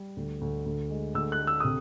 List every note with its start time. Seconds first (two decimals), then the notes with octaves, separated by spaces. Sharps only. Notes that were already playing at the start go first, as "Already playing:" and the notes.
Already playing: G3
0.17 D2
0.41 D2
0.66 D2
0.90 G#3
1.14 D2 E6
1.32 F#6
1.40 A3
1.47 E6
1.60 C3 D#6